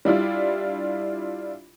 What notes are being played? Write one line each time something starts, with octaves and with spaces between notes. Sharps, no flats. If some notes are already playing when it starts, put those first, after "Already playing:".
G3 D4 E4 F4